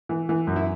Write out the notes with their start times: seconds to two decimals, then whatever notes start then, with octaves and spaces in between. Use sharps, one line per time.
0.09 E3
0.29 E3
0.47 F#2
0.56 E4